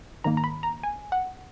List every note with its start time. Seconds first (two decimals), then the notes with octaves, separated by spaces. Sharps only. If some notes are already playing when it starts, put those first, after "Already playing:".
0.24 G#2 D#3 A#3 A#5
0.37 A#5
0.44 B5
0.63 A#5
0.83 G#5
1.12 F#5